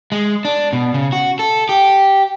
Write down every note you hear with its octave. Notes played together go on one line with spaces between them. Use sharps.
G#3
D4
B2
C#3
F#4
A4
G4